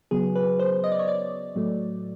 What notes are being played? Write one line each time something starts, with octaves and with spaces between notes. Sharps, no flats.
C#3 F#3 B3 G#4
B4
C5
D#5
D5
C#5
D5
A2 F#3 A3